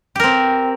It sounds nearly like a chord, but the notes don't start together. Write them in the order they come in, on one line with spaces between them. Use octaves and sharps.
G4 A#4 C4